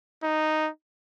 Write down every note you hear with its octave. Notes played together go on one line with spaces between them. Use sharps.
D#4